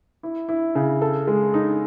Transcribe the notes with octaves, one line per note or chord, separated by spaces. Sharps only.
E4
E4
C#3
A4
G#3
D#4